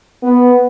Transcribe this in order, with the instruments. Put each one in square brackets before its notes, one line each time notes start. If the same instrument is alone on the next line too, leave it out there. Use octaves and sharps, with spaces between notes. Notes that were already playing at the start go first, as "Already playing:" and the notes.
[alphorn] B3